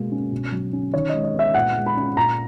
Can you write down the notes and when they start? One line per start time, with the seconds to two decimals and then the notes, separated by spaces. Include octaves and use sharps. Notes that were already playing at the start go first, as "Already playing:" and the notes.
Already playing: B2 G#3 A#3
0.11 C#4
0.32 B2
0.52 F#3
0.73 C#4
0.93 D#3 C#5
1.09 G#3 D#5
1.24 D#5
1.34 B3 E5
1.54 A#2 F#5
1.76 G#3
1.86 B5
1.97 C#4
2.17 A#2 A#5